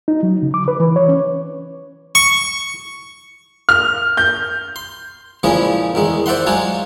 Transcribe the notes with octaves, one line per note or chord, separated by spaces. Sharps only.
D#4
F#3
C#3
D6
B4
E3
C#5
C#4
C#6
F6
G6
C6
A#2 C#3 E3 F3 G#3 G#4
E2 D#3 G#3
C5 D5 E5 F#5 C6
F#3 G#3 D4 F4 G#4